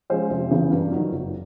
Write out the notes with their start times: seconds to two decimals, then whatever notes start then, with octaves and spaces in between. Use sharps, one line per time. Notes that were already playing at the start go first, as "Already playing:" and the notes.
0.10 F3 G#3 C#4 C5
0.30 F1
0.51 E2 C#3 E3
0.71 G2
0.92 D#3 F#3
1.12 F#1